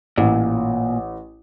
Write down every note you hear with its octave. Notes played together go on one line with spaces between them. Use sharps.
A1 A#2